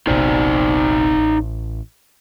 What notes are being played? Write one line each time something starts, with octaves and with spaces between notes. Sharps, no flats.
E1 A#1 C3 D#4 C5 D5
A1